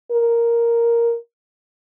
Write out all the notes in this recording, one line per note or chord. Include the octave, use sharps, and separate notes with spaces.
A#4